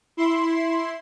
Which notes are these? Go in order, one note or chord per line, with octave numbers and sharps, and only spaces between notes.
E4 C6